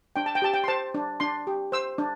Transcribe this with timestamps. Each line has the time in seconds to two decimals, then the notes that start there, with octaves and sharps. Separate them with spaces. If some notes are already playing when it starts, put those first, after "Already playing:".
0.16 D4 G5
0.26 A5
0.35 G5
0.42 G4 A5
0.54 G5
0.64 C6
0.68 C5 A5
0.94 D4
1.20 D4 C6
1.47 G4
1.72 C5 E6
1.98 D4